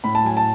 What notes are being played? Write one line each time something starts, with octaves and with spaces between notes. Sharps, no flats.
A2 B5
A5
F#3 G#5
A5